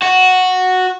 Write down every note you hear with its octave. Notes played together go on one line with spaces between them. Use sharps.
F#4